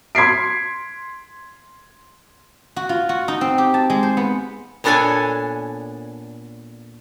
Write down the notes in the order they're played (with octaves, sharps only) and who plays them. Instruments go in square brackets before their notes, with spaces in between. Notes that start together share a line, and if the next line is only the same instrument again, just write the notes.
[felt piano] C6 G#6 B6 C7 D7
[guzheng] F#4
F4
F#4
D#4
C4
G4
A5
G#3
C5
B3
[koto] A#2 B3 D4 A4 C#5 G#5